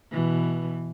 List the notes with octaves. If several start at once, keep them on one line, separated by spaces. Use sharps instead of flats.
B2 E3